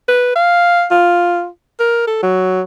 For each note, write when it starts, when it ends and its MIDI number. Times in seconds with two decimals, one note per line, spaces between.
0.08 0.34 71
0.36 0.86 77
0.91 1.48 65
1.80 2.03 70
2.07 2.21 69
2.23 2.62 54